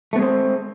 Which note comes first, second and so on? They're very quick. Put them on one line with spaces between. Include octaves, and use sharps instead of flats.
A3 B3 G#3 C4